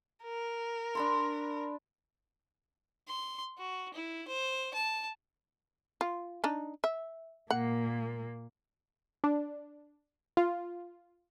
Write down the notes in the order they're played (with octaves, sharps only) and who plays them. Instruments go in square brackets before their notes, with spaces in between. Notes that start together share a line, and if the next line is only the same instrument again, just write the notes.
[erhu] A#4
[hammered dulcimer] D4 B5 C6
[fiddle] C6
F#4
E4
C5
A5
[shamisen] F4
D4 D#4
E5
[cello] A#2 A#3 [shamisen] F#5
[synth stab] D4
F4